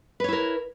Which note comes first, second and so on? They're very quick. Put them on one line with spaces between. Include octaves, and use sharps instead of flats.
B4 C#5 E4 A#4